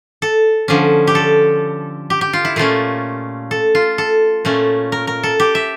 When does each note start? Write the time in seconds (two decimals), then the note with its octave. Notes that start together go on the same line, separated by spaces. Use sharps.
0.22 A4
0.68 D3 F3 C#4
1.07 G4
1.15 A4
2.10 G4
2.21 G4
2.33 F4
2.45 E4
2.56 A#2 A3 C#4 F4
3.51 A4
3.75 F4
3.98 A4
4.45 A#2 A3 C#4
4.92 A#4
5.07 A#4
5.23 A4
5.40 G4
5.55 E5